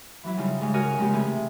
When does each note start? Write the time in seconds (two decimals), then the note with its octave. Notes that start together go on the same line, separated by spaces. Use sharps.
0.24 E3 F#3 E4
0.37 C#3 G3 D#4 F4
0.61 G#2 C#3 G#3
0.74 F#4 A#4 D#5 G#5 D#6 F6
0.98 F2 C#3 G#3 A#3 F4 G4
1.13 C3 E3 A3 G#4